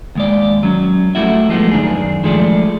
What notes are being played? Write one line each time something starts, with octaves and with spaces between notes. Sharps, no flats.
D#2 G#3 D5
F#3 C#4
G3 A3 E4 F#4 E5
F3 G#3 A3 B3
F#2 D#3 D4 G#4
F3 G#3 A3 G#4 D5